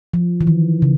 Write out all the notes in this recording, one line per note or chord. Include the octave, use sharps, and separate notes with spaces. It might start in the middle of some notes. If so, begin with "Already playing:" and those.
F3
E3
D#3
C#3